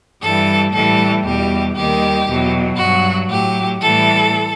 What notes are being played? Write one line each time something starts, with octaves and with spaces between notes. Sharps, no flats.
G2 E3 G3 A4
A2 E3 G3 A4
E2 B2 G3 G4
D#2 D#3 G3 G4
E2 B2 F#3
G2 F#3 F#4
A2 F#3 G4
A2 E3 G3 A4